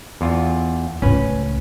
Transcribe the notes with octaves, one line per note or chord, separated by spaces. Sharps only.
E2 F4
C#2 A2 C#4 B4